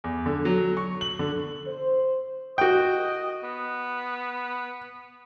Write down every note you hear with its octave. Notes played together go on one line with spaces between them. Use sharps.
E2
D3
F#3
C#6
F#7
D3
C5
F#4 D#5 G5
B3